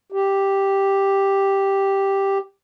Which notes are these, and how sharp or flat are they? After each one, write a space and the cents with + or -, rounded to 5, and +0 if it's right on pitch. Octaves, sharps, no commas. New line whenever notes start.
G4 +0